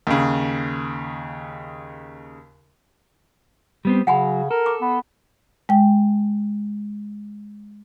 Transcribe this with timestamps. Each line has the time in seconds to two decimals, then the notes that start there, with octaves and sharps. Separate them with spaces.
0.07 D#2 C#3
3.85 G3 B3 C4
4.07 C#3 F#3 F#5 G#5 B5
4.51 A4 A#4
4.66 D6
4.81 B3
5.69 G#3 G5